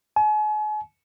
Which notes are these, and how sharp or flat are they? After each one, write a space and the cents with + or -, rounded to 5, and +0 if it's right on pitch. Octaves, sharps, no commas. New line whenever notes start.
G#5 +40